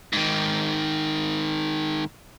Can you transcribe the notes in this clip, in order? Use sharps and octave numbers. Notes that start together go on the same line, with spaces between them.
G#2 D#3